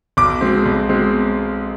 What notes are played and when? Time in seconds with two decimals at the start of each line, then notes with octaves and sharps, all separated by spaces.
0.17 B1 D6
0.41 B2 G#3 C4
0.66 B1
0.89 B2 G#3 C4